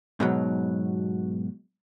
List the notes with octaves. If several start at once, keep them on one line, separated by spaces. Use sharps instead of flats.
G#2 B2 F#3